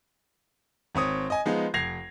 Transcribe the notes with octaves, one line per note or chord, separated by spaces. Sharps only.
G#1 C4 C#5 D#6
D#5 G#5
F3 G#3 B3 D#4
F1 G#6 A#6 C7 F7